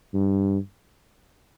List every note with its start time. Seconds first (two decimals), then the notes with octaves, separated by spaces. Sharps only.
0.14 G2